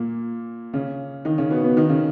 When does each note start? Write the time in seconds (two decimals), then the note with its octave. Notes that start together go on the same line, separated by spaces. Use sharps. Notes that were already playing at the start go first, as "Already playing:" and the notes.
Already playing: A#2 A#3
0.73 C#3 C#4
1.25 D#3 D#4
1.38 C#3 C#4
1.51 B2 B3
1.64 B2 B3
1.77 D#3 D#4
1.89 C#3 C#4